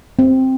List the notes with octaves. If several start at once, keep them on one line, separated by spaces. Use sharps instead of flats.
C4